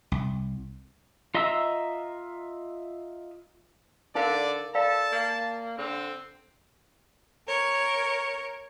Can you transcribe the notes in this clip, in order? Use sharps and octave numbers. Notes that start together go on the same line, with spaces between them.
C2
F4 D#5 E5 A#5 E6
D3 D#4 A#4 D5 F5
A4 D5 F5 A5 B5
A#3
D3 C4
A#4 C#5